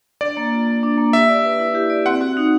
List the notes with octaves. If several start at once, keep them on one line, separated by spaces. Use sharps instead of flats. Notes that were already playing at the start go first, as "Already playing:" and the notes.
D4 D5
A#3
F4
A#3
D4
A#3
G4 E5
D5
B4
E4
G4
D5
C4 F#5
F#4
D#4